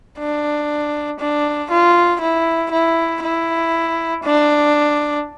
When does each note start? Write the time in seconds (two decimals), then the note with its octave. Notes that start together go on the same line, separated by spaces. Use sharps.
0.19 D4
1.20 D4
1.70 F4
2.21 E4
2.71 E4
3.23 E4
4.23 D4